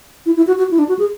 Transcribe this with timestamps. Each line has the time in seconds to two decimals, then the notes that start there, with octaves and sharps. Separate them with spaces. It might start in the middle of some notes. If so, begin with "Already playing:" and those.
0.26 E4
0.37 E4
0.47 F#4
0.58 F#4
0.71 E4
0.79 D4
0.89 F#4
0.99 G#4